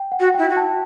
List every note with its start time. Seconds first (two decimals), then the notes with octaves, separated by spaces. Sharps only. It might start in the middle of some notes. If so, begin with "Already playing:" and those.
Already playing: G5
0.12 F#5
0.20 F#4
0.34 E4 G5
0.50 F#4
0.57 A5